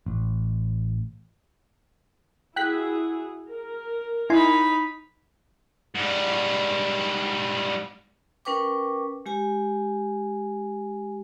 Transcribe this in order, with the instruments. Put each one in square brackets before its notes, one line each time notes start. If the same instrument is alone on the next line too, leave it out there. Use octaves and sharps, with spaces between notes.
[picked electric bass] A1
[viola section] E4 F#4 G#4 [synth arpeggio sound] G5 F#6 B6
[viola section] A#4
[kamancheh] D#4 B5 [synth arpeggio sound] E4 G#5 C6
[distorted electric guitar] G#2 G3
[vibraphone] C#4 A#4 B4 G5 C#6 D6
G#3 G4 G#5